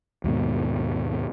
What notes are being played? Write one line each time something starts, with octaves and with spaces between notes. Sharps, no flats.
D#2 G#2 B2